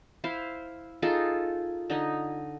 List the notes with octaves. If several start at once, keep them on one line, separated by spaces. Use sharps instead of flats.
E4 C5 F5
D#4 F4 G#4 A4
D3 D#4 D#5